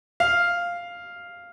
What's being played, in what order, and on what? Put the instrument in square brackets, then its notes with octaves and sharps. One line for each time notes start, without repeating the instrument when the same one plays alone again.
[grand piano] F5